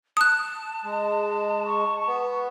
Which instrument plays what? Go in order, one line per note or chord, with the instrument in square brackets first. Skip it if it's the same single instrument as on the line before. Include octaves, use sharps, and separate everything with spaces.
[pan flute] A5 [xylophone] D#6 F#6
[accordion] G#3
[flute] C#6
[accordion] B3